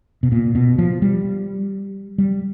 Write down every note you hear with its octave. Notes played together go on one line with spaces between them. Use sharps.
B2
A#2
B2
F3
G3
G3